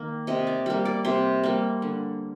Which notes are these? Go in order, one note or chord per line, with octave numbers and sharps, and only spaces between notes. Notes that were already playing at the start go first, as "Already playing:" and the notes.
Already playing: D#3 A#3
C3 D#5
D5
G3 A#3
D5
C3 C5
G3 A#3
D3